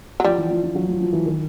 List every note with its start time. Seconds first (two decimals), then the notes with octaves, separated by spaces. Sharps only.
0.20 F#3
0.24 F3 G3
0.38 E3
0.50 F3
0.63 F3
0.75 F#3
0.88 F3
1.00 F3
1.13 E3
1.26 D#3